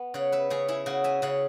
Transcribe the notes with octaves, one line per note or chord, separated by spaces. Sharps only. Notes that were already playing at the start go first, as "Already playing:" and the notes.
Already playing: B3
C#3 C#5 F#5
B4 E5
C#3 G#4 C#5
E4 G#4
C#3 F#4
E5 G#5
C#3 C#5 F#5